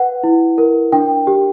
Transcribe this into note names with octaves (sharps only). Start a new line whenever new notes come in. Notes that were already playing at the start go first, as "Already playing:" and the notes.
Already playing: B4 F#5
E4
A#4
D4 G5
G4